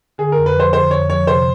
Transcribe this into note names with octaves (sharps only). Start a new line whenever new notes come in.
D3 G#4
F2 A#4
B4
F3 C5
D3 C5
F2 C#5
F3 C#5
C3 C5